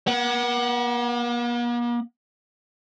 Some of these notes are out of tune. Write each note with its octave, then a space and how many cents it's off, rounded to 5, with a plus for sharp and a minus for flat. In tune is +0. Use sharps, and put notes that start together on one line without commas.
A#3 +45 F#5 +15